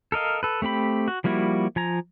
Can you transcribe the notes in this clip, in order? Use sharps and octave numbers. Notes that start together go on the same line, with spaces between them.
A4 A#4 D#5 F5
A4 B4
A3 C4 G4 B5
F#4
F3 G3 A#3 E4 F#4
F3 G#5 A#5